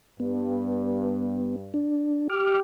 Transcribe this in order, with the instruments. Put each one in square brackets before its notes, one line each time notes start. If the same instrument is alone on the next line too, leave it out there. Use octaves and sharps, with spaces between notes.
[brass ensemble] G2 [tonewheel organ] B3
[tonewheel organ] D4
[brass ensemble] G4 [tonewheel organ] D6 F6